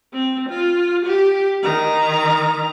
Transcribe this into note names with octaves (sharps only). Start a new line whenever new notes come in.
C4
F4
G4
D#3 A#5